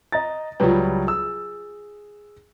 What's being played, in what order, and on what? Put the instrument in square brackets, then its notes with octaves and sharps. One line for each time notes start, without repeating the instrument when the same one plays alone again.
[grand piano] D#5 A#5 A6
[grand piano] C#2 F#3 G3 [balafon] F4 B4
[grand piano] G#4 E6